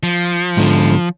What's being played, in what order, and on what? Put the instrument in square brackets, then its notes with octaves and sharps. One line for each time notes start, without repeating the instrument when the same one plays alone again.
[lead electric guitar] F3
[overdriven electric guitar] G#2 D3